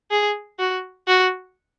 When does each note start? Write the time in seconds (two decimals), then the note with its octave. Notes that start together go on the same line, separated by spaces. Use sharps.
0.11 G#4
0.59 F#4
1.08 F#4